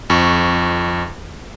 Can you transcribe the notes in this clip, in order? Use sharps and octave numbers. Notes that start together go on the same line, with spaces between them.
F2 C#6